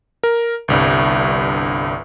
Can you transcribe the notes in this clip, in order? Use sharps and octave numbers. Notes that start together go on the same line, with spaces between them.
A#4
G1 C2 G2